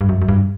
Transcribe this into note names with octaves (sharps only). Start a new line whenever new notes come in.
G2
F#2
F#2
G2